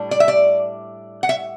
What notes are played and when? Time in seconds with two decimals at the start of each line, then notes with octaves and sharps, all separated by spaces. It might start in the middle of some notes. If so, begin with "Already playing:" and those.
Already playing: A2 G3 D4
0.11 D5
0.20 E5
0.28 D5
1.23 F#5
1.29 E5